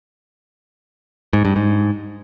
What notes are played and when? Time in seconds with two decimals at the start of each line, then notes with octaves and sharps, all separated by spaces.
1.33 G#2
1.45 G2
1.56 G#2